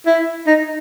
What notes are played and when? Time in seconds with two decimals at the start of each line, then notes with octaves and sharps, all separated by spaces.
0.06 E4
0.47 D#4